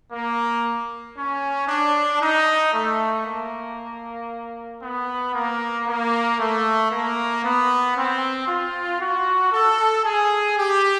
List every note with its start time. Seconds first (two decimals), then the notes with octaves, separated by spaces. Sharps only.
0.13 A#3
1.17 C#4
1.68 D4
2.21 D#4
2.73 A3
3.26 A#3
4.82 B3
5.34 A#3
5.87 A#3
6.39 A3
6.91 A#3
7.44 B3
7.96 C4
8.48 F4
9.00 F#4
9.52 A4
10.05 G#4
10.58 G4